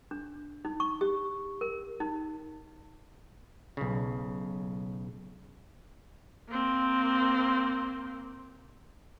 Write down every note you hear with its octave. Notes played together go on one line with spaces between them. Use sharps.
D4
D#4
C#6
G4
A#4
D#4
B1 C#3
A#3 C4